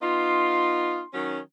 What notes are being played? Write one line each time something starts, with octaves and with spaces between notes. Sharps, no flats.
B3 D#4 F4 C6
D#3 F#3 C#4